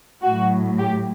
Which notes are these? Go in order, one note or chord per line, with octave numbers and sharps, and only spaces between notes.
A2 F#3 F#4
G4